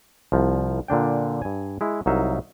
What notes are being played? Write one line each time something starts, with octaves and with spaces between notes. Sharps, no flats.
C2 F3
A#2 D3 D4 G5
G2 G#5
G#3 E4
C2 F#3 D#4 E5 F5